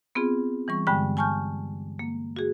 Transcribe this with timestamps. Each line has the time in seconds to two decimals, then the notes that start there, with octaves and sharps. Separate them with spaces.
0.15 B3 C4 F4 G#4
0.68 E3 G3 C#6
0.87 G2 D3 G#3 G5
1.17 G#5 A5 C#6 F6 G6
1.99 A#3
2.36 F#4 G#4